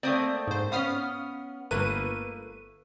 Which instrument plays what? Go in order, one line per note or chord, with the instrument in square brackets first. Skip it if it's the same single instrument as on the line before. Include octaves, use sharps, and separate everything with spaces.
[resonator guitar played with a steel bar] A3 A#3 C4 [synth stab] D5 D#6
[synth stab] G#2 C5
[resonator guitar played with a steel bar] B3 C#4 [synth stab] F5 D#6 F6
[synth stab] G1 B4 D#7 [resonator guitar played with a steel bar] A3 A#3 A#4